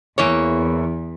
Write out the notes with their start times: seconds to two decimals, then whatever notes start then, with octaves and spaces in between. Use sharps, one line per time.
0.18 E2 E3 A#3 C#5